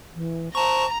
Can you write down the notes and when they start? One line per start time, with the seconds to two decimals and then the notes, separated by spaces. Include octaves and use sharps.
0.14 E3
0.55 C5 A5 A#5 C#6